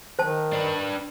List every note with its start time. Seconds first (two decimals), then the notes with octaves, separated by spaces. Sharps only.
0.19 D#3 C5 A5
0.53 D4 B4